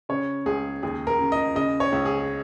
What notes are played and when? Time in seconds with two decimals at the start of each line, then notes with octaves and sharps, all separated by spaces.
0.09 C#3 C#5
0.46 C#2 G#4
0.83 D#2 G#4
1.07 A#4
1.19 C#3
1.32 D#5
1.55 C#3 D#5
1.80 C#5
1.92 C#2
2.05 G#4